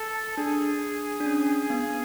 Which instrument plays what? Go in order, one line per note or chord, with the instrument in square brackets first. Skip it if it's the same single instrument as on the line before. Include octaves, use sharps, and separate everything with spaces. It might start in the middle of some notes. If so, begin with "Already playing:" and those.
Already playing: [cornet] A4
[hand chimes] D4 [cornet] G#4
[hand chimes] D4
C#4
B3